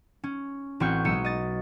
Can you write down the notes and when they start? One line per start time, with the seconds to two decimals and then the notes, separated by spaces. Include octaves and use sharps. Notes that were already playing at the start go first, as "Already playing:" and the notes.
0.24 C#4
0.80 A1 C4 F#4 C#6 F6 G6
1.05 B1 G#3 D#6 E6 C#7
1.25 D#5 A6